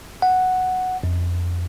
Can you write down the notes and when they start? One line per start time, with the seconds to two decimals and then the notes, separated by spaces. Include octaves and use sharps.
0.22 F#5
1.03 F2